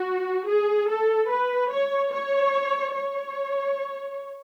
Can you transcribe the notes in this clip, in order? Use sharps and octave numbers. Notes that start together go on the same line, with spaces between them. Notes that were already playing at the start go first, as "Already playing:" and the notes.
Already playing: F#4
G#4
A4
B4
C#5
C#5
C#5